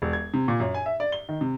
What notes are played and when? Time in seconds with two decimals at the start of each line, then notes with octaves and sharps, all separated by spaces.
0.02 E1
0.13 G#6
0.34 C3
0.48 A#2
0.60 F#2
0.74 G#5
0.86 E5
1.00 D5
1.12 G7
1.29 D#3
1.41 C3